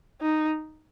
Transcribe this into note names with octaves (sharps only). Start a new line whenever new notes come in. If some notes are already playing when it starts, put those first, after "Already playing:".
D#4